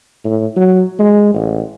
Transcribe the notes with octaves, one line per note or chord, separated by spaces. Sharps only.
A2
F#3
G#3
A1